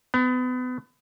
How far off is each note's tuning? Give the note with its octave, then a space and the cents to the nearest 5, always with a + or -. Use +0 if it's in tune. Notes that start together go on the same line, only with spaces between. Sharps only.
B3 +30